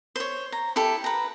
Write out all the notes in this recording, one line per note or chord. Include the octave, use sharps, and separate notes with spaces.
C5 C#5
A#5
E4 G4 A4
B4 A#5